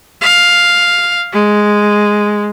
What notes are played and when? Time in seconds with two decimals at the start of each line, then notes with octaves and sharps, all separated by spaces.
0.22 F5
1.33 G#3